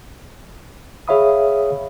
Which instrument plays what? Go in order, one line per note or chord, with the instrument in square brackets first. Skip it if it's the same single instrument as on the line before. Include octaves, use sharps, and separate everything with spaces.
[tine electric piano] G#4 C#5 E5 F5 B5 D#6